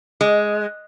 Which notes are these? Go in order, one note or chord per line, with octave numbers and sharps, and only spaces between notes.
G#3